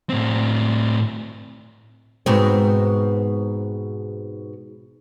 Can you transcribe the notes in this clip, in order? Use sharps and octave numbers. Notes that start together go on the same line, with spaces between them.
A2 C4
G#2 B2 C4